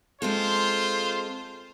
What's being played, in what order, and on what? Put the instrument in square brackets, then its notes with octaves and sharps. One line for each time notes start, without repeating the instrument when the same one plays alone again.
[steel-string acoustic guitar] G#3 C4 A4 [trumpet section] F4 C5